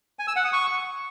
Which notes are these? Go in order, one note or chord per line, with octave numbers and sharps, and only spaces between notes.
G#5
E6
F#5
D#6
C#6